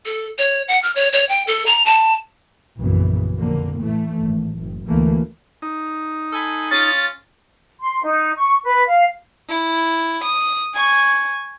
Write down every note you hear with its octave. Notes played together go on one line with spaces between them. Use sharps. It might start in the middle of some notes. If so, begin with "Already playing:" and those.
A4
C#5
F#5
F6
C#5
C#5
G5
A4
A#5
A5
A#1 F#2 C#3 E3 B3
F2 D3 A#3
A2 E3 A3
G#1
F#1
D2 E3 A3 A#3
D#4
A4 G#5 B5
C#4 F4 A6
C6
D#4
C#6
B4
F5
E4
D#6
G#5 C#6